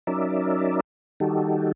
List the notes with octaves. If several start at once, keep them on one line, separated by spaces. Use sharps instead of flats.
F#3 C#4 D#4 A#4 D5 E5
D#3 G3 D#4 F#4 G4 A4